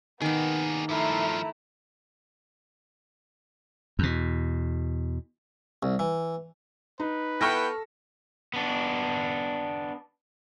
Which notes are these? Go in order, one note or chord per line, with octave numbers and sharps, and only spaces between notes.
D#3 A#3 B3 D#4 G#4
G2 F3 A3 E4 A#5
E2 B2
C2
E3
D#4 B4
B3 E4 A4 G5 C#6 F6 A#6
B3 D4